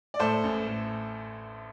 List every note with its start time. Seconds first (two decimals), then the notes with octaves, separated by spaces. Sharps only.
0.14 D5
0.19 A2 A4 C5
0.44 A1
0.67 A2